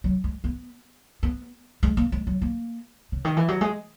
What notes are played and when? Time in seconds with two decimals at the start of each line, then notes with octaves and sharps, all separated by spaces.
0.04 F#3
0.24 G#3
0.44 B3
1.23 B3
1.83 G#3
1.97 A#3
2.12 G#3
2.27 F#3
2.41 A#3
3.12 C#3
3.25 D#3
3.37 E3
3.48 F#3
3.61 G#3